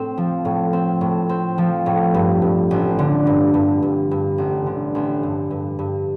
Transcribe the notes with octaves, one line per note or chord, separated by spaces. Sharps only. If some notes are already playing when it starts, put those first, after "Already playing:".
Already playing: A2 C4
F3
A2
C4
A2
C4
F3
A2
G2
G2
A1
D3
G2
G2
G2
G2
A1
D3
A1
G2
G2
G2